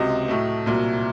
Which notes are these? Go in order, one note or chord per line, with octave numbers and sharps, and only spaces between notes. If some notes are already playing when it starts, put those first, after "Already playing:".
Already playing: C#2 C3 F#3 D#5
A2 F#3 A3
C2 A#2 F#3